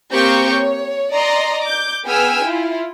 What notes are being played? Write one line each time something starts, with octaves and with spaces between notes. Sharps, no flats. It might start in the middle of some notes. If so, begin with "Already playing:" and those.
A#3 C4 G4 C5 C#6 G6
C#5
D5 D#5 A#5 C6
D6 G6
B3 G#4 G5 G#5 E6 F6
E4 F4